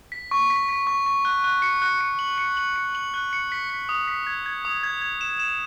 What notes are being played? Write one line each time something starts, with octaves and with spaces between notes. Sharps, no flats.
B6
C#6
B6
B6
C#6
C#6
F#6
F#6
C#7
F#6
C#7
F#7
C#7
F#7
C#7
F#7
F#6
C#7
B6
B6
D#6
B6
G#6
G#6
D#6
G#6
G#6
E7
E7